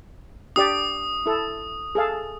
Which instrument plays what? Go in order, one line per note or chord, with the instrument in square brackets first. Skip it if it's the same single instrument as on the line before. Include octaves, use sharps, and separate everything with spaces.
[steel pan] D4 G4 D5 [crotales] D#6
[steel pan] E4 A4
G#4 A4 F5